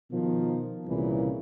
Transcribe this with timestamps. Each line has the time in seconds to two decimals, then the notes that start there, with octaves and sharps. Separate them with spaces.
0.12 B2 D#3 F3
0.86 C2 A#2 C#3 E3